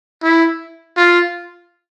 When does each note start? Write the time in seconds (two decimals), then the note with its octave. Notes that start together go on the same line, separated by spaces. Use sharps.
0.23 E4
0.97 F4